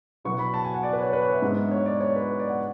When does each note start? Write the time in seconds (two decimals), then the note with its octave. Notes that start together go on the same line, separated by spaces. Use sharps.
0.25 B2 F#3 B3 E4 C#6
0.39 B5
0.54 A5
0.64 G#5
0.74 F#5
0.83 D5
0.93 B4
1.02 C#5
1.13 B4
1.23 C#5
1.32 E5
1.42 G#2 G#3 B3 D4
1.71 C#5
1.86 D5
2.01 C#5
2.16 B4
2.39 D5
2.49 F#5